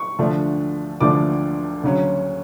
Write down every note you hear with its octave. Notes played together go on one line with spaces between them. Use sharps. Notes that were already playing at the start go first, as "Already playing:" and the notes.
Already playing: C#6
D2 D3 F3 A3 D4
D2 D3 F3 A3 D4 D6
D2 C#3 F#3 C#4